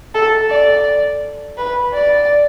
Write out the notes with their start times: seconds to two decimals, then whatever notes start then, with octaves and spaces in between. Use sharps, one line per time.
0.14 A4
0.50 D5
1.57 B4
1.94 D5